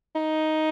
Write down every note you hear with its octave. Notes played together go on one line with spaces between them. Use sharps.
D#4